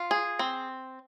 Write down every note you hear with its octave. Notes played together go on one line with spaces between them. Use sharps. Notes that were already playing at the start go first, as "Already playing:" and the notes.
Already playing: F4
G#4
C4